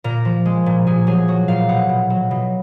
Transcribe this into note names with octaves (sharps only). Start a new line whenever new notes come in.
A#2 A#4
F3
G#3
A#2
A#2 G#4
F#3 G#4
F#3 F#4
A#2 F5
B2 F#5
B2
F#3
B2